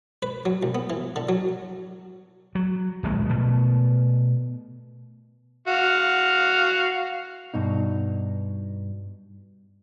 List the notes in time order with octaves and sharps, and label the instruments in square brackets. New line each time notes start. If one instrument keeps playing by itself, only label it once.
[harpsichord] B4
F#3
C2
B3
E3
D3
F#3
[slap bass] F#3
D1 A#1 G#3
B2 A3
[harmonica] F#4 F5
[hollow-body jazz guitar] G2 B2 D#4